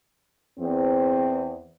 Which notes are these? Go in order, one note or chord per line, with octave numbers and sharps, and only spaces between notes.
E2 C4